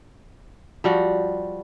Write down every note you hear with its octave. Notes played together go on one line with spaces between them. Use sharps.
F3 G3 F#4